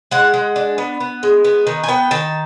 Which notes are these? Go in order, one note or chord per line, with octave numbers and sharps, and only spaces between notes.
G#3 F#5
G#3
D4
B3
B3
G#3
B3
D#3
G#5
B3 G5
D#3 A5